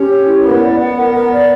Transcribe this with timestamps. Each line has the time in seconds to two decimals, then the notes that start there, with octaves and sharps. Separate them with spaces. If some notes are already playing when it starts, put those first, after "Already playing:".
Already playing: C#4 G4
0.09 C#5
0.27 E4
0.44 B3 A#4
0.62 D5
0.80 F#5
0.96 A#4
1.14 A#4
1.32 D5